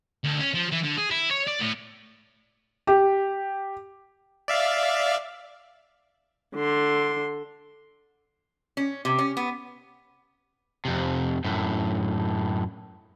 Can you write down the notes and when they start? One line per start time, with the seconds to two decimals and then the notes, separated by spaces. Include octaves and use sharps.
0.24 D2
0.40 C#4
0.54 F3
0.72 E3
0.84 D3
0.98 G#4
1.11 E4
1.31 C#5
1.47 D5
1.60 A2
2.87 G4
4.48 D5 E5 F5
6.56 D3 C6
8.77 C#4
9.05 C3
9.19 C#4
9.37 B3
10.85 F2 C3
11.44 F#2 A2